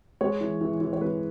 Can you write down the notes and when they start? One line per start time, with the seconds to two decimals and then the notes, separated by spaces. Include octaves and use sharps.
0.21 G#3 C#5
0.41 E3
0.61 E3
0.81 E3
0.93 C#5
1.01 G#3 B4